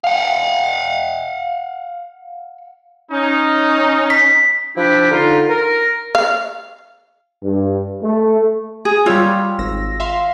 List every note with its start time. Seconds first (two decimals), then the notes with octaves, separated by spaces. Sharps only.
0.04 F5 F#5
3.12 C#4 D#4
4.10 B6
4.77 F3 D4 E4 G4
5.11 D3 D#4 F4
5.49 A#4
6.15 F5
7.43 G2
8.02 A3
8.85 G#4
9.06 G3 F4 C#5 E6
9.59 G#1 E6 A#6
10.00 E5 F5 C6